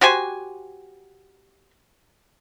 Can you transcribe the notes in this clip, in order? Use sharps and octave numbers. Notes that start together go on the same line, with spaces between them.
F#4 G4 C5 G#5